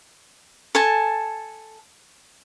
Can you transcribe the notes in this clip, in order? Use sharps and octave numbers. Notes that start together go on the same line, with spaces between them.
A4 G#5 A5